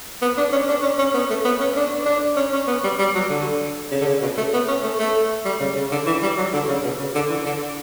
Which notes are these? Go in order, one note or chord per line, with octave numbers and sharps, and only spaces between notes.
B3
D4
C#4
D4
C#4
C#4
B3
A3
B3
C#4
D4
D4
C#4
C#4
B3
G3
G3
F#3
D3
C#3
D3
C#3
B2
A3
B3
C#4
A3
A3
G3
C#3
C#3
D3
E3
G3
F#3
D3
C#3
B2
C#3
D3
E3
D3